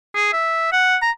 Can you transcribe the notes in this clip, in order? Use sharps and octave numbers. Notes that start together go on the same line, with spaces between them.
G#4
E5
F#5
A#5